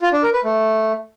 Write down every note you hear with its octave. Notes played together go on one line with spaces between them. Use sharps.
F4
D4
A#4
B4
A3